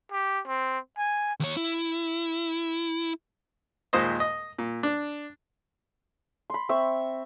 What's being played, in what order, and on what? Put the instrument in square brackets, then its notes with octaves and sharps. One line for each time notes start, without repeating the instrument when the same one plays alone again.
[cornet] G4
C4
G#5
[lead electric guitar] D#2 C#5
E4
[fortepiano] D#2 A#2 G#3 C5 D#5
D#5
A#2
D4
[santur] B5 C6
C4 E5 C#6